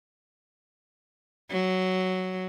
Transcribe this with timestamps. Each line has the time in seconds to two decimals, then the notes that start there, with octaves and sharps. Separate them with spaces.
1.51 F#3